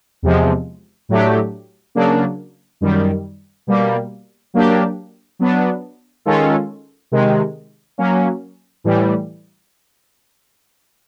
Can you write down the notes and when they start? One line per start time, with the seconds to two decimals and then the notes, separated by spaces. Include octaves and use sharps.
0.23 E2 C3 F3 G#3
1.09 A2 F#3 A3 D4 G4
1.95 C#3 F#3 A#3 D4
2.81 F#2 D#3 G3
3.67 B2 G3 A#3
4.54 F#3 A#3 D4 G4
5.39 F#3 B3 D4
6.25 D#3 G#3 C#4 F4 A4
7.12 C3 D#3 G#3
7.98 F#3 A#3 C#4
8.84 A2 E3 G3